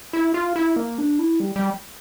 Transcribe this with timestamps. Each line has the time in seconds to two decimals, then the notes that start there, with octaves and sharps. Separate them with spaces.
0.13 E4
0.34 F4
0.56 E4
0.76 A#3
0.98 D4
1.19 E4
1.40 G3
1.56 G3